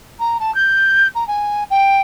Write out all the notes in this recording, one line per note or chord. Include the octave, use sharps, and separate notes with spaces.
A#5
A5
G6
A#5
G#5
G5